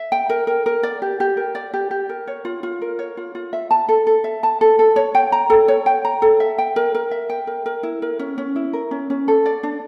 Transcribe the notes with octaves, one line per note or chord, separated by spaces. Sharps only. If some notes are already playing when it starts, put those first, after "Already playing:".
Already playing: E5
G5
A#4
A#4
A#4
D5
G4
G4
A#4
D5
G4
G4
A#4
C#5
F4
F4
A#4
C#5
F4
F4
E5
A5
A4
A4
E5
A5
A4
A4
C#5
G5
A#5
A4
C#5
G5
A#5
A4
E5
G5
A#4
A#4
E5
G5
A#4
A#4
E4
A#4
C#4
C#4
E4
A#4
C#4
C#4
A4
D5
D4